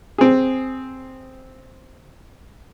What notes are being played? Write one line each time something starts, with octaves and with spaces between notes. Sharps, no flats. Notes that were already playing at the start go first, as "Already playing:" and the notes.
C4 G#4